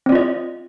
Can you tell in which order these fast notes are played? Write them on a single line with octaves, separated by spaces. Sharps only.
C4 D5 F4 D#5